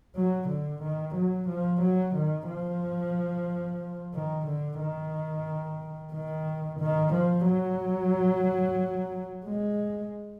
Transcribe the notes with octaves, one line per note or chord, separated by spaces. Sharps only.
F#3
D3
D#3
F#3
F3
F#3
D#3
F3
D#3
D3
D#3
D#3
D#3
F3
F#3
G#3